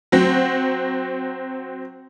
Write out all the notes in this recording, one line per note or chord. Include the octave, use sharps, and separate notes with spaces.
F#3 C4